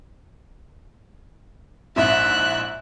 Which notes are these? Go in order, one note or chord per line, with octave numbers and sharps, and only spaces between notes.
A#1 G#2 E4 E5 F#6